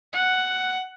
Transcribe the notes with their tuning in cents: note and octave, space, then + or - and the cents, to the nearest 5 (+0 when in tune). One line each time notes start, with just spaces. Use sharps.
F#5 +5